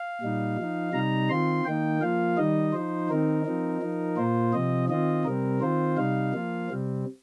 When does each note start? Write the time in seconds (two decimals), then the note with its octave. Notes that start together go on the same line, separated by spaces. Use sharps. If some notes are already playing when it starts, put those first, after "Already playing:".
Already playing: F5
0.21 A#2 G3 D#4
0.57 F3 D#4
0.93 C3 G3 D#4 A#5
1.29 D#3 C4 F4 C6
1.65 D#3 A#3 D#4 G5
2.01 F3 A#3 F4 F5
2.37 D#3 G3 D#4 D#5
2.73 F3 D#4 C5
3.09 D#3 C4 D#4 A#4
3.45 F3 C4 D#4
3.82 F3 D#4
4.17 A#2 A#3 F4 C5
4.53 C3 F3 C4 D#5
4.89 D#3 C4 F4 D#5
5.25 C3 G3 C4 A#4
5.61 D#3 C4 F4 C5
5.97 C3 G3 D#4 F5
6.33 F3 A#3 F4
6.69 C3 G3 C4